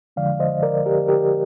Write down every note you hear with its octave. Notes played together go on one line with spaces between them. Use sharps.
F2 D3 F3 G#3 D5 F5
C5 D#5
A#4 D5
G4 A#4
G4 A#4